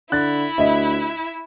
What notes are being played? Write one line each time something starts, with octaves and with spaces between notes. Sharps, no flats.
D3 E4 F#6 A6
D2 D#5 E5